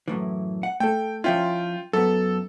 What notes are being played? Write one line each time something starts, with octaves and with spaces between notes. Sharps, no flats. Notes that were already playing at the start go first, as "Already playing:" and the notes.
F#2 A2 E3
F#5
A3 A4 G5
F3 C#4 E4 F4 G5
F#2 B3 A4